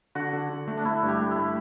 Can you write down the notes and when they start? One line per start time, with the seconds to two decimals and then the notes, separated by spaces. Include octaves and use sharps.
0.15 D3 F#4
0.33 D3
0.50 D3
0.68 A3
0.77 D4
0.85 A3 E4
1.03 G2
1.08 G4
1.20 A3
1.31 E4
1.38 A3